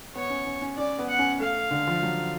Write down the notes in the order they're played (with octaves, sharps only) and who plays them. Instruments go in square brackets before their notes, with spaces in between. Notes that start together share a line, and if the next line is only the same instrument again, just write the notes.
[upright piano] B3 [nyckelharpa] C#5
[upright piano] C#4
C#4
C#4
[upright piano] C#4 [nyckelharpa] D5
[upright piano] B3
[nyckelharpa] F#5
[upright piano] C#4
[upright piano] A3 [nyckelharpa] F5
[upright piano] D3
F3
F#3